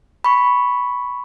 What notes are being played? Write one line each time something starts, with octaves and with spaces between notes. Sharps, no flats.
B5 C#6